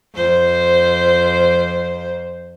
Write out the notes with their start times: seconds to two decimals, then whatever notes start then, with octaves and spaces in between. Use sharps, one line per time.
0.14 F2 C5